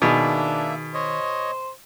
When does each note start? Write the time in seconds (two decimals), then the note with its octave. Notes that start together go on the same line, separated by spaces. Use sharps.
0.02 B2 D#3 A#3 D4 G#4 E5
0.94 C5 C#5 D#5